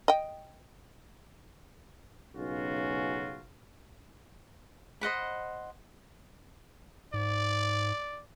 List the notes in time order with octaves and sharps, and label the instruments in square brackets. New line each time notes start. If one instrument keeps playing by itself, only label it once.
[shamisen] D#5 G5
[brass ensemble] B1 C#3 C#4 F4 F#4
[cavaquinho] C5 D#5 F#5 B5
[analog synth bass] G#2 [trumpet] D5